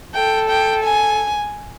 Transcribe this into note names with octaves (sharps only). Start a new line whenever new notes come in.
A4 G5
G5
G#5